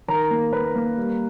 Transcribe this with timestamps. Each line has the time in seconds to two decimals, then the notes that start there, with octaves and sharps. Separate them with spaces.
0.08 D#3 A#4 A#5
0.31 A#3
0.53 A#3 B4 B5
0.75 A#3
0.97 G3